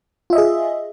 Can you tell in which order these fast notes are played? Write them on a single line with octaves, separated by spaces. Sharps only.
F4 E5 D#5 G#4